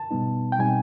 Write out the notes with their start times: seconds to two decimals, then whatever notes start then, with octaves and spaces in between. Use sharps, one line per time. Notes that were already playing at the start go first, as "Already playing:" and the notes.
Already playing: A5
0.11 B2 G3 B3 D#4
0.52 G5
0.59 B2 G3 C4 D#4 G#5